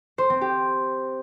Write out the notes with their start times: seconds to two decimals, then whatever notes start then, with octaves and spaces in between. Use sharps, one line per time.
0.18 C5
0.30 C4
0.41 G4